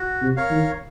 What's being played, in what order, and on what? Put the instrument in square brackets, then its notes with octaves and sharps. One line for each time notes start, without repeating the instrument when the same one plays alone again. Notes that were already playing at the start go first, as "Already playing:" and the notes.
Already playing: [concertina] F#4
[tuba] C3
[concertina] A#4 C#5 F5
[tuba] D#3